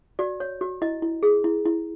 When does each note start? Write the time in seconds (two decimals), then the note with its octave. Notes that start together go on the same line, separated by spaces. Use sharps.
0.19 F#4 D5
0.40 C#5
0.61 F#4
0.82 E4 D#5
1.02 E4
1.23 G#4
1.44 E4
1.66 E4